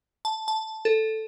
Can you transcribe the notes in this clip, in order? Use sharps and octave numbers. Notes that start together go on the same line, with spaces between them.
A5
A5
A4